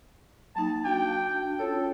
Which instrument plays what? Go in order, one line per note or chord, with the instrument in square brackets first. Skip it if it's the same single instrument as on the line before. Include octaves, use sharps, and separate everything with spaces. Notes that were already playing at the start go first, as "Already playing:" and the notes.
[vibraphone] F#3 A#3 D#4 [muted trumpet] A5
[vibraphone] D4 F#4 A5 [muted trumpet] G5
[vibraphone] C#4 F4 C#5 [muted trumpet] A4